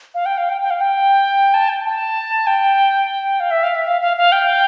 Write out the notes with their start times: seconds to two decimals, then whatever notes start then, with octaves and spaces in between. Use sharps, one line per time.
0.15 F5
0.26 G5
0.38 F5
0.49 G5
0.62 G5
0.71 F5
0.81 G5
1.54 A5
1.69 G5
1.85 A5
2.47 G5
3.40 F5
3.51 E5
3.63 F5
3.75 E5
3.87 F5
4.01 F5
4.17 F5
4.32 G5